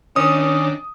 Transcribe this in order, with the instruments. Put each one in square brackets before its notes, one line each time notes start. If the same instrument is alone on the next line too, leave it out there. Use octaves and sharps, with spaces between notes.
[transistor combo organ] D#3 D4 [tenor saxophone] C#4 [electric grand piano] D#6